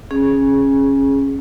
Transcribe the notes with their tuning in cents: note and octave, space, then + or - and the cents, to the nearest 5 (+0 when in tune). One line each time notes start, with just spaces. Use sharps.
C#4 -15 G#4 +0